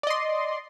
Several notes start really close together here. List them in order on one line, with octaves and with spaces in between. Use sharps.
D5 D#5 C6